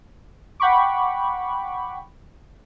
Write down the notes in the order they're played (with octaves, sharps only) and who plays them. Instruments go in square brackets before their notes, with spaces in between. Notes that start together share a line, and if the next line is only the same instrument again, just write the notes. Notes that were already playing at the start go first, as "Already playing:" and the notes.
[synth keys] F#5 G5 B5 C#6 D6